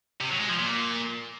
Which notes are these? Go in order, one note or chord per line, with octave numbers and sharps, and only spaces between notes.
C3
F#3
G#3
F3
A#2